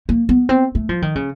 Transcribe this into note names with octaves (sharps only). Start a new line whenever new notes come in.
A#3
B3
C4
A3
F3
D#3
C#3